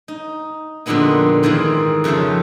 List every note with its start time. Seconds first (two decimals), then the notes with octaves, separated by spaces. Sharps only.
0.08 D#4
0.86 F2 A#2 D3 G#3 B3 D#4
1.43 G#2 D#3 E3 G#3 C4 D#4
2.04 F2 C#3 F3 E5 A5